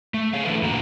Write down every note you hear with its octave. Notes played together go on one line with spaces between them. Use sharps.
A3
G#4 C#5 F5
D3 E3 E4 A4 B4
E2 A#2 D3 F#4 A#5